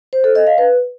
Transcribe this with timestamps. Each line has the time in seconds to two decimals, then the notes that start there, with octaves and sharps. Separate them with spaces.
0.13 C5
0.24 A4
0.35 D#5
0.47 F5
0.58 B4